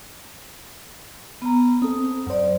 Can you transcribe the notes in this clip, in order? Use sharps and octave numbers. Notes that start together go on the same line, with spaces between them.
B3 A#5
C4 A4 D#6
F#2 F#3 C5 D5